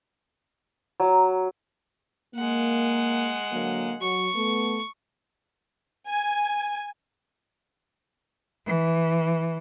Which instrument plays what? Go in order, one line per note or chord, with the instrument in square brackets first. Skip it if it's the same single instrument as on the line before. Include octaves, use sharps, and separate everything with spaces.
[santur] F#3
[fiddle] G#3 F#5 [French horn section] A#3
[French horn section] D3 F#3 A#3
[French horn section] F#3 [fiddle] C#6
[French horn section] A3 B3
[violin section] G#5
[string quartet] E3